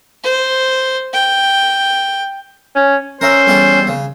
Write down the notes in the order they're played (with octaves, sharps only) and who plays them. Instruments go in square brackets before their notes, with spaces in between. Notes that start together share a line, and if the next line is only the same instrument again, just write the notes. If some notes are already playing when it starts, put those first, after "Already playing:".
[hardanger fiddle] C5
G5
[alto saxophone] C#4
[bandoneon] C#4 [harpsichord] A#4 E5 [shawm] C5
[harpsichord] E2 G3 A4
C#3